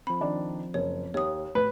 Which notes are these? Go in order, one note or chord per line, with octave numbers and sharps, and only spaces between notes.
F3 C4 B5
D#3 D4 D5
F#1 C#5
D#2 C#5 D#6
A2 B4